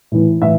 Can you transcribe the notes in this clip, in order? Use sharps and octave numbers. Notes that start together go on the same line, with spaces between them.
A2 E3
A2 E3 E5